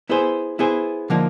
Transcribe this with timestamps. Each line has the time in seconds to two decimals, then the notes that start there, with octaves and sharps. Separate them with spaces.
0.09 B3 E4 G#4 C5
0.59 B3 E4 G#4 C5
1.10 D3 F3 A#3 D#4